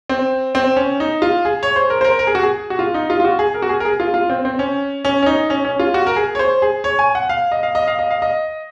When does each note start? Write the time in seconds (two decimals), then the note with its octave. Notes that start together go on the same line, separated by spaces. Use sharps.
0.09 C4
0.55 C4
0.76 C#4
1.00 D#4
1.22 F4
1.45 G#4
1.63 C#5
1.76 C5
1.90 A#4
2.01 C5
2.04 A#4
2.19 A#4
2.27 G#4
2.35 F#4
2.43 G#4
2.70 F#4
2.79 F4
2.94 D#4
3.10 F4
3.20 F4
3.25 F#4
3.39 G#4
3.54 A#4
3.62 F#4
3.69 G#4
3.80 A#4
3.85 G#4
4.00 F4
4.14 F4
4.30 C4
4.45 C4
4.59 C#4
5.05 C#4
5.22 C#4
5.26 D#4
5.50 C#4
5.65 C#4
5.79 F4
5.94 F#4
6.07 A#4
6.16 G#4
6.35 C#5
6.39 C5
6.62 G#4
6.84 C#5
6.99 G#5
7.15 F#5
7.29 F5
7.52 D#5
7.63 F5
7.75 D#5
7.88 F5
7.99 D#5
8.11 F5
8.22 D#5